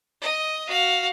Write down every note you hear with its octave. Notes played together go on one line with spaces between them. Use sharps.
D#5
F#4 F5